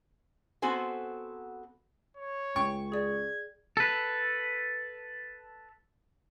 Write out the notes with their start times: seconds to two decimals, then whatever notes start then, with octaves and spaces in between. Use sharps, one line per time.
0.62 B3 C4 F#4 A4 C5 G#5
2.17 C#5
2.56 C#2 G5 C#6
2.92 G#4 D5 G#6
3.77 A4 B4